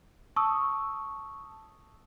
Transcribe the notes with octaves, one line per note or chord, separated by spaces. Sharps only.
A5 C#6 D#6 E6